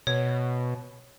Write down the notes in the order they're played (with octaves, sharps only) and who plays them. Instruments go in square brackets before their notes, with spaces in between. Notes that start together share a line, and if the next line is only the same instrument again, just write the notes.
[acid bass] B2 [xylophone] C#5